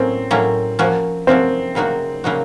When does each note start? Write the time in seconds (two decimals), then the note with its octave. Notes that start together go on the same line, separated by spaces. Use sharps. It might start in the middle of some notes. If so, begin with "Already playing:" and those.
Already playing: A2 F#3 A#3 C4 C#4
0.31 A2 F#3 A#3 C#4
0.79 F3 A#3 C#4 F#4
1.27 F3 A#3 C4 C#4 F#4
1.75 C#3 F#3 A#3 D#4 F#4
2.24 C#3 F#3 A#3 D#4 F#4